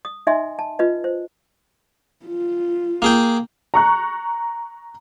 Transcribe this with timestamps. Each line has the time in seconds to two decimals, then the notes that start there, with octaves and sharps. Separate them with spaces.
0.05 D#6
0.27 D#4 D#5 E5 G#5 C6
0.59 A5
0.79 F4 B4 D#5
1.04 C5
2.25 F4
3.02 A#3 G#4 G5
3.74 A#5 C#6 F#6